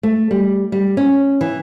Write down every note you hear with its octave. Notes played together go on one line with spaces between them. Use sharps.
A3
G3
G3
C#4
E3